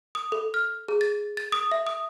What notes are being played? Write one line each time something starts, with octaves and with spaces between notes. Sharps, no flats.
D#6
A4
F6
G#4
A6
A6
D#6
E5
D#6